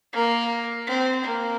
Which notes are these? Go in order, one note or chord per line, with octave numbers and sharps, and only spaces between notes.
A#3
C4
A#3